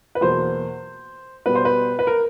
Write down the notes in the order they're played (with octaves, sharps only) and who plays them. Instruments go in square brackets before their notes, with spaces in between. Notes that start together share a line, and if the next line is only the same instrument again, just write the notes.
[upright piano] B4
E2 B2 F#3 A#3 C5
B2 G3 B3 B4
C5
B4
B4
A#4